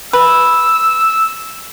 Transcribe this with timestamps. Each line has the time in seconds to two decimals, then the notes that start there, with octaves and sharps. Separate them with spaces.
0.13 B4 E6